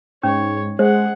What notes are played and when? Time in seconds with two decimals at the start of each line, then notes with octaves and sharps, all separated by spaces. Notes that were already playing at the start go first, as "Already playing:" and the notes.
0.23 G#2 C#4 C#5
0.79 G#3 G#4 C5 F#5